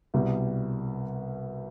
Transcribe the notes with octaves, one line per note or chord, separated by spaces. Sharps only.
C2 B2 G3